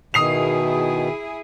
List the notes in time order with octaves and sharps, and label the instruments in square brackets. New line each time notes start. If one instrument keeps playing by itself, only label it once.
[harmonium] B2 D#3 [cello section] E4 G#4 [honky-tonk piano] D#6 C7 F7